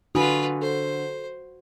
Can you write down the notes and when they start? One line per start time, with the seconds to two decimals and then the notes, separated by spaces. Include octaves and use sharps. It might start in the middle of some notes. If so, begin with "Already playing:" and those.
0.15 D3 F4 F#4 B4 G#5 D#6
0.62 A4 C5